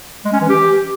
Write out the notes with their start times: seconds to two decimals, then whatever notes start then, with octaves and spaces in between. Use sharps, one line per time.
0.25 G#3
0.33 C#4
0.41 E3
0.49 G4